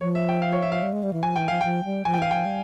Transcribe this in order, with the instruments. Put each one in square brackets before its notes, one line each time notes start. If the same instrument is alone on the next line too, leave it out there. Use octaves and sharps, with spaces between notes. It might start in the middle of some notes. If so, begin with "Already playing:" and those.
[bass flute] F3 [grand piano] C#5
[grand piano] E5
G5
F5
C#5
E5
F5
[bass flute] G3
G#3
G3
E3
[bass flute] F3 [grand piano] G#5
[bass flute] E3 [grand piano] G5
[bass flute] F3 [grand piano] F5
[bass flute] F3 [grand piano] G5
[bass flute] G3
[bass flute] F3 [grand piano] G#5
[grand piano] G5
[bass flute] E3 [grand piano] F5
[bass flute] F3 [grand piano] G5
[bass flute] G3